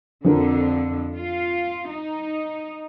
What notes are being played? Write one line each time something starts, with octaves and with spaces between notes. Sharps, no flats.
F2 D3 F3 D4 A#4
F4
D#4